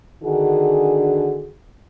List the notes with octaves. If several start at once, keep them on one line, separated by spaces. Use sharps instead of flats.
D3 D#3 D4 F#4 G#4